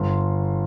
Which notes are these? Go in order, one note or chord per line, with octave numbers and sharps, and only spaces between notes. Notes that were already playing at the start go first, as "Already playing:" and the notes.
Already playing: G1 C6